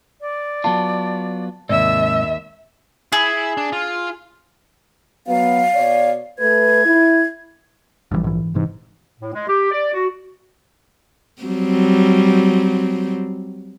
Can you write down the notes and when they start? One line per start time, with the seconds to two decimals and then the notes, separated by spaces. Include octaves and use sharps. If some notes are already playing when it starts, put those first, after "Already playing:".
0.20 D5
0.64 F#3 B3 F4 A5
1.69 D#2 G#2 C3 D5 E5 E6
3.12 E4 G#4 E5
3.57 D4
3.73 F4
5.27 F#3 B3 F5
5.74 B2 C#5 D5
6.39 A3 B4 G#6
6.85 E4
8.12 A#1 G2 E3 G3
8.24 G#2 E3
8.54 E1 G#2 C3 E3
9.20 A2
9.34 G#3
9.48 G4
9.72 D5
9.94 F#4
11.42 F#3 G3 C4